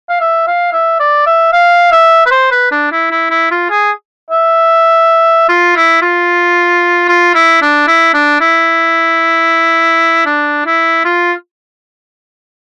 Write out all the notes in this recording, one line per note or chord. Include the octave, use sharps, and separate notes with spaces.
F5
E5
F5
E5
D5
E5
F5
E5
B4
C5
B4
D4
E4
E4
E4
F4
G#4
E5
F4
E4
F4
F4
E4
D4
E4
D4
E4
D4
E4
F4